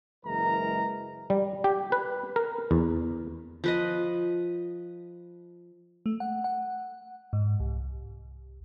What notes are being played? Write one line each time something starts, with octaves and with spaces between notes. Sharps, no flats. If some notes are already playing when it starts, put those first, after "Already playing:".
F#1 E3 G#3 A#4 A#5
G3
G4
B4
A#4
E2
F3 B4 D#5
A3
F#5
F#5
G#2
C2